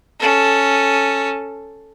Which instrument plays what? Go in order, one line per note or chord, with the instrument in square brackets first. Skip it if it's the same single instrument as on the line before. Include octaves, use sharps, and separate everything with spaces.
[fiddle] C#4 A4